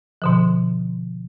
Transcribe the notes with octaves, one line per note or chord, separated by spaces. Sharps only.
B2 D3 F3